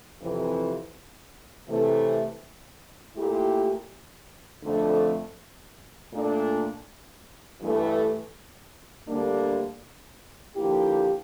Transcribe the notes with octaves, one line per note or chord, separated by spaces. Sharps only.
F2 C3 E3
C3 E3 A3
A#2 A3 E4 G4
F2 D3 A3
A#2 A3 D4
G2 E3 A3
D2 D3 G3 A#3 D4
D3 F3 A#3 E4 G4